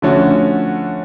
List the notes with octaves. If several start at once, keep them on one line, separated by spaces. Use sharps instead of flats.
D3 F3 A3 C#4 F#4